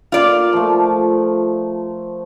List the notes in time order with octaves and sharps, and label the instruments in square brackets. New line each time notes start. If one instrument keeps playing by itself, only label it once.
[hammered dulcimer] A#3 [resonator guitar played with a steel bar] F4 D5
[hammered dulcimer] F3 A3